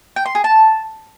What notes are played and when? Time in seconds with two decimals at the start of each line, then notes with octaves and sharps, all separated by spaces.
0.16 G5
0.26 C6
0.35 G#4
0.44 A5